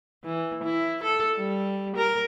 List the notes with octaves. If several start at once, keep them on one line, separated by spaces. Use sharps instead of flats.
E3
E4
A4
G3
A#4